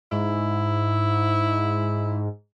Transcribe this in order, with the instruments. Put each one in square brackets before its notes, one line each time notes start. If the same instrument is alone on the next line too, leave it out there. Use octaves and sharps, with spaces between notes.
[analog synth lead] G#2 [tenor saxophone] E4